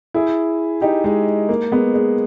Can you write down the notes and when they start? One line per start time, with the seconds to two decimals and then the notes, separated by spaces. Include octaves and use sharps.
0.14 E4 G#4
0.81 D#4 G4
1.04 G#3
1.49 A#3
1.71 G#3 B3
1.94 G#3